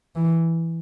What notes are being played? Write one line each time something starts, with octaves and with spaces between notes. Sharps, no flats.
E3